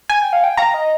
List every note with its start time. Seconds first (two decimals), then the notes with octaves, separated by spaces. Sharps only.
0.10 G#5
0.21 G5
0.33 F5
0.44 G5
0.58 F5 A#5
0.74 D#5